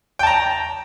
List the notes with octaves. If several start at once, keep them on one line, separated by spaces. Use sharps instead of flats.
G5 A5 A#5